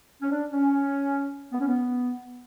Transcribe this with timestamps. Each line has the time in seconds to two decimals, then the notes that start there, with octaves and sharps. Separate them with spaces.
0.22 C#4
0.31 D4
0.52 C#4
1.52 B3
1.60 C#4
1.67 B3